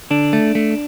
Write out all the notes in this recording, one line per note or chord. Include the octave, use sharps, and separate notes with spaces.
D3 D4
A3
A3